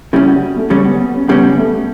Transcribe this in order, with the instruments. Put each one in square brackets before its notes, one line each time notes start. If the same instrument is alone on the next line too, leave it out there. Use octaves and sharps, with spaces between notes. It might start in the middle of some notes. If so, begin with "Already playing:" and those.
[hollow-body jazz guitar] C#3 G3 C#4 [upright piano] E4
[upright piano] F#4
A3
[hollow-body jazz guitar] C#3 G3 C#4 [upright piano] A3
[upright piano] B3
B3
C#4
[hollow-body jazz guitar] C#3 G3 C#4 [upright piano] B3
[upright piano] A3